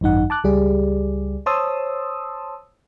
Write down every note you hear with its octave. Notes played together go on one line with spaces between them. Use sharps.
G#1 F#2 D#4 F#5
A5 D6 F#6
C#2 G3 G4 G#4 D5
C5 C#5 A5 C6 D#6 E6